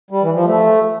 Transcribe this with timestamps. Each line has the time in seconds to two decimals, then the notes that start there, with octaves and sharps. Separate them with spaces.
0.11 G3
0.23 E3
0.34 F3
0.46 A3